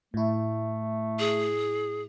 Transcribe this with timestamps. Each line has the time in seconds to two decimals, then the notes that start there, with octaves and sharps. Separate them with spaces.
0.14 A2 A3 E4
1.19 G#4